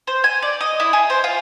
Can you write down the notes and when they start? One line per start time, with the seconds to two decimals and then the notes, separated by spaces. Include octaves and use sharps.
0.07 C5
0.24 G#5
0.42 D5
0.60 D#5
0.80 E4
0.93 G#4
1.10 C5
1.24 F4